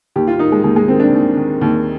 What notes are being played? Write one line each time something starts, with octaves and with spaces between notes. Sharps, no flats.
D#2 G4
F4
D#3 D#4
G#3
D#2 G#3
G#3
D#3 C4
D4
D#2
D#3
D#2